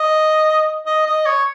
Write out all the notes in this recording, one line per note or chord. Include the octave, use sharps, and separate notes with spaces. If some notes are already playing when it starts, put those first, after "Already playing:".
Already playing: D#5
D#5
D#5
C#5